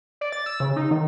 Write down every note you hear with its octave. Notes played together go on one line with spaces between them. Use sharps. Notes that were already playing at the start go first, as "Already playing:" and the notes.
D5
A6
E6
C#3
D#4
D#3